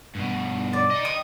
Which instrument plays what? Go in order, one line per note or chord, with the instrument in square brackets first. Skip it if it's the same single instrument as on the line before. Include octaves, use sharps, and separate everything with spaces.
[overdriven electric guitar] G2 B2
[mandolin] D5
[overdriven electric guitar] D#5 G5
[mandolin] D#6